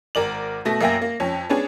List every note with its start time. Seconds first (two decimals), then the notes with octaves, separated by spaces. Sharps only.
0.15 G#1 A#4 D5 F#7
0.65 B2 A3 A#6
0.81 F#2 A#3 E5 G5 G#5 A#6
1.02 A#3
1.20 F2 C#4
1.50 B3 C#4 D4 G#4